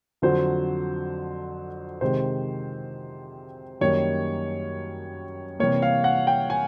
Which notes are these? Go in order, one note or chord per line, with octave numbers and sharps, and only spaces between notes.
F2 D3 F#3 C5
C3 D#3 G#3 C5
F#2 D#3 G3 A#3 C#5
C3 E3 G3 A#3 C#5
F5
F#5
G5
G#5